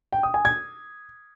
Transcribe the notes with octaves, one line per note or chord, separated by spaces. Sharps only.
G5
D#6
G#5
G#6